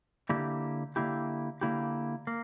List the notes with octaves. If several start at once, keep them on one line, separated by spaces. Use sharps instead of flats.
D3 A#3 E4 G4
D3 A#3 E4 G4
D3 A#3 E4 G4
A#3